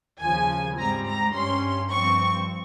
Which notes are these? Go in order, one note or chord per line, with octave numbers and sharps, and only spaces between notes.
D#2 C#3 F3 G#5
G#2 G3 C4 A#5
A#5
G2 G3 C#4 C6
G2 F3 C4 C#6